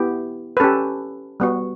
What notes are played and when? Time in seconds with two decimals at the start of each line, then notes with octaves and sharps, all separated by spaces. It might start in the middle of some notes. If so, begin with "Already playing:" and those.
Already playing: B3 E4 G4
0.57 B4
0.60 C#4 G4 A4
1.40 G3 B3 F#4